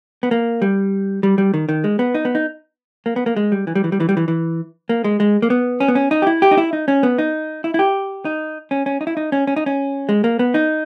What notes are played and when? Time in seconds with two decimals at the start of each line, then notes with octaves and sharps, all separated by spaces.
0.23 B3
0.31 A#3
0.62 G3
1.23 G3
1.38 G3
1.54 D#3
1.69 D#3
1.84 G#3
1.99 B3
2.14 D#4
2.25 B3
2.35 D#4
3.06 A#3
3.16 B3
3.26 A#3
3.36 G#3
3.52 G3
3.67 E3
3.75 G3
3.84 E3
3.92 G3
4.00 E3
4.09 G3
4.17 E3
4.28 E3
4.89 A#3
5.04 G#3
5.20 G#3
5.42 A#3
5.50 B3
5.80 C#4
5.88 B3
5.95 C#4
6.11 D#4
6.22 G4
6.27 E4
6.42 G4
6.51 D#4
6.58 E4
6.73 D#4
6.88 C#4
7.03 B3
7.18 D#4
7.64 E4
7.74 E4
7.79 G4
8.25 D#4
8.71 C#4
8.86 C#4
9.01 D#4
9.07 E4
9.17 D#4
9.32 C#4
9.47 C#4
9.56 D#4
9.66 C#4
10.09 G#3
10.24 A#3
10.39 B3
10.54 D#4